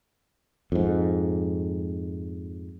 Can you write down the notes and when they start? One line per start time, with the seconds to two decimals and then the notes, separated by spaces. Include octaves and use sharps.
0.72 F2 G#2